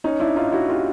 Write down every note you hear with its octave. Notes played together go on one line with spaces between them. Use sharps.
C#4 D#4
D4 E4
D#4 F4
E4 F#4
F4 G4